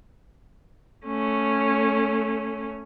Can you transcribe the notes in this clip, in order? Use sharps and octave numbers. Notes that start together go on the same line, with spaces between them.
A3 C#4